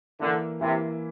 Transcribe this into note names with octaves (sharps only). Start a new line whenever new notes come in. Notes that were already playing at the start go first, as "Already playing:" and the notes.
D3 E3 A#3 E4
C3 E3 A#3 E4